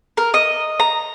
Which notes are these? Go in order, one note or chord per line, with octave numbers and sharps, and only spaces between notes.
A#4
D#5
A#5